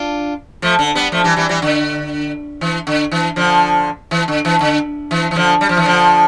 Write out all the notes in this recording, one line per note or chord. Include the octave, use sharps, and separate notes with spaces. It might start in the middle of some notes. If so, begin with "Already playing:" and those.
Already playing: D4 F4
F3 A3
D3
G3 B3
F3 A3
E3 G3
E3 G3
E3 G3
D3
E3
D3
E3
D3 F3
E3
D3
E3
D3
E3
E3
D3 F3
G3
F3
E3
D3 F3